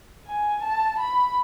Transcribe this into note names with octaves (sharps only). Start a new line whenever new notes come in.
G#5
A5
B5